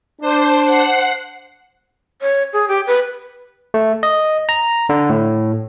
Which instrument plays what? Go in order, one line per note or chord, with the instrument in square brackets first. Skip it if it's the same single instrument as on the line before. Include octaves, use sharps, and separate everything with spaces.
[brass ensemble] D4 [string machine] C5
[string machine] F#5 C7
[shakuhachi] C#5
G#4
G4
B4
[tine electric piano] A3
D#5
A#5
D3
A2